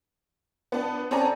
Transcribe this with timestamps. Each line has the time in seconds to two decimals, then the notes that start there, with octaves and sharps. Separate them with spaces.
0.72 B3 D4
1.11 C4 C#4 A4 D5 G#5 A#5